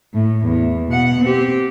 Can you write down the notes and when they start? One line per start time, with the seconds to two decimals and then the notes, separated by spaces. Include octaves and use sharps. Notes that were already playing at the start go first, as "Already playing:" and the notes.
0.14 A2
0.45 E2 E3
0.89 B2 F#5
1.21 C4 G4